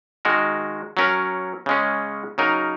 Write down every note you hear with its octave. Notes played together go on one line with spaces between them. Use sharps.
D#3 G#3 F#4 A#4
F#3 C#4 A#4
C#3 G#3 C#4
C#3 F#3 D#4 A#4